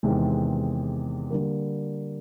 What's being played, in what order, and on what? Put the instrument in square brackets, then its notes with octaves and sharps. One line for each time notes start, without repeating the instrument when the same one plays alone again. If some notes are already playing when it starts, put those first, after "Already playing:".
[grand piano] E2 C3 D#3 G#3
D3 G3 A#3